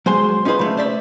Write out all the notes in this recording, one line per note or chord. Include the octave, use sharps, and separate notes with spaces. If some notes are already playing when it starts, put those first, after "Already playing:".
F#3 G#3 C5 G#5 C6
C#4 D#4 F4 G#4 B4 C5
C#3 A3
C5 D5 E5